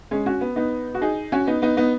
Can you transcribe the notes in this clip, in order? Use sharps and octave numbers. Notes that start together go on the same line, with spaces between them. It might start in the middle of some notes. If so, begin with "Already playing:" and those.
G#3 C#4
C#4 F#4
B3
B3 D#4
F#4
D#4 G#4
C#4 F#4
B3 D#4
B3 D#4
B3 D#4